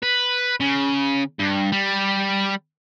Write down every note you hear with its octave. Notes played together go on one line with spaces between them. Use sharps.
B4
C#3
G2
G3